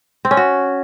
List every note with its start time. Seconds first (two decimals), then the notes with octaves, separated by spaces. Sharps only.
0.25 C4
0.31 C#4
0.37 F#4